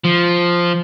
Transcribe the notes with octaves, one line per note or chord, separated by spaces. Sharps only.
F3